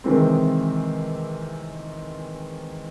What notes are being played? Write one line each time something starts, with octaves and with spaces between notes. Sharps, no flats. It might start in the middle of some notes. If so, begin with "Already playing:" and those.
C3 D#3 E3 G#3 C4